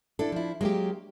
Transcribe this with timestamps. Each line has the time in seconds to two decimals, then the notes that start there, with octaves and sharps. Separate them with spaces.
0.19 D4 E4 A4
0.32 F3 E4
0.61 F#3 G#3 A#3 G4